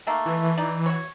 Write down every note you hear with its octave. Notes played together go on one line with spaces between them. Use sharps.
D#3 A3 A#3
E3
D#4 D5
F#4 C#5